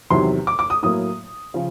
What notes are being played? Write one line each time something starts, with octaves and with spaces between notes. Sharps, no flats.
E2 C3 D#3 F#3 C6
D6
D6
D#6
A2 F#3 A#3 D#6
C#3 F3